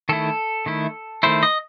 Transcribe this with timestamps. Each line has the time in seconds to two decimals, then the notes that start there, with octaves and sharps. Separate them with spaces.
0.09 D#3 A3 E4 A4
0.66 D#3 A3 E4
1.23 D#3 A3 E4 C5
1.43 D#5